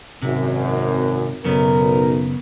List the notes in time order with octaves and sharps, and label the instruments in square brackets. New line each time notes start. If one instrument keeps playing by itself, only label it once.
[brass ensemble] G#1 F#2 [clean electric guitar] C3
[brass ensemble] B1 A#4 [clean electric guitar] F#2 C#3 B3